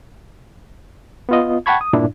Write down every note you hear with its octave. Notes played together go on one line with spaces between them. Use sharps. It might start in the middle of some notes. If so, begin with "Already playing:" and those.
B3 F4 D#5
F#5 G5 A5 B5 C#6 G#6
D#6
G2 A#2 D4 E4